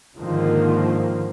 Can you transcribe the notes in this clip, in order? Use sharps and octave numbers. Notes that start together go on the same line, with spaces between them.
G#2 D3 D#3 F3 A#3